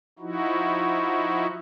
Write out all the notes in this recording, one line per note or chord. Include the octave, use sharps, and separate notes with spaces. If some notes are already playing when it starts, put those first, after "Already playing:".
F3 D#4 E4 F#4